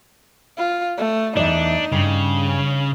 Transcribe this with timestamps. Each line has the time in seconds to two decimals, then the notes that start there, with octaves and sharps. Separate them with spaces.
0.57 F4
0.98 A3
1.37 E2 E3 D4 D#4 D5
1.92 G2 C#3
2.47 C#4